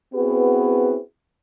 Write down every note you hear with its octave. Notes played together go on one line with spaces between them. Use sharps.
B3 C4 E4 F#4 G#4 B4